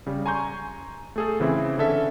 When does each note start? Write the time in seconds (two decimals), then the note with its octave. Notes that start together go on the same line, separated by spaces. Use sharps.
0.06 C#3 G3
0.26 G#5 A#5 C6 C#6 G6
1.16 A3 G#4 A4
1.40 C#3 E3 C4 E4
1.78 D3 C#4 A4 E5